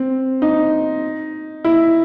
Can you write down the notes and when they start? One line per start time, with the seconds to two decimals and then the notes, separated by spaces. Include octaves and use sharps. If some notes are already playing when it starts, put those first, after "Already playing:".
Already playing: C4
0.42 D#4
1.64 E4